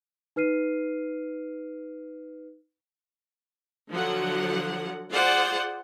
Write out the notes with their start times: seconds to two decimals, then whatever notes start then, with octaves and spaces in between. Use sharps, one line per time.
0.36 D#4 B4 F6 C7 D#7
3.91 D3 F3 F#3 F#5
5.12 F4 G#4 C5 D5 F#5